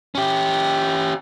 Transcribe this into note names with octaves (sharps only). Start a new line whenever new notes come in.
C#4 G4